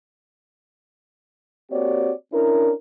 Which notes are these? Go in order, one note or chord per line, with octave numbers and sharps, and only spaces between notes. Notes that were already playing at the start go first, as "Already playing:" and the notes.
A#3 C4 F#4 G4 C#5 D5
C#4 D4 E4 A#4